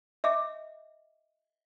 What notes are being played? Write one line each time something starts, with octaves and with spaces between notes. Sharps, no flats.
D#5 E5 D6